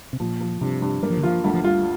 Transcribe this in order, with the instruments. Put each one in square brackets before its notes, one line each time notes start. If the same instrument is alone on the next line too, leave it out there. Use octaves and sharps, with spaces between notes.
[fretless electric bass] C3
[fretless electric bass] A#2 [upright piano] F3
[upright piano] F3
[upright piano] G2 [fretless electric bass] C3
[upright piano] G2
[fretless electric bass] G3 [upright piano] A#3
[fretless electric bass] F3
D3
[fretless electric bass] F3 [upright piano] F4
[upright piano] D2 [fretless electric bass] G3
[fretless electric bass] F3
[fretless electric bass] G3 [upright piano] F4